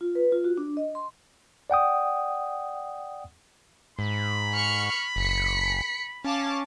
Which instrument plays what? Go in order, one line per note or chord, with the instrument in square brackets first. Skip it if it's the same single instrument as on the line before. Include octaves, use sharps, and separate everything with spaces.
[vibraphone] F4
B4
F4
F#4
D4
D#5
C6
[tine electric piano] D5 F#5 G5 D#6
[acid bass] G#2 [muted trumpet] B5
[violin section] C#6 F6 C#7
[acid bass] F#1 [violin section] B6 C#7
[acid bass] C#4 [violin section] F5 A5 D6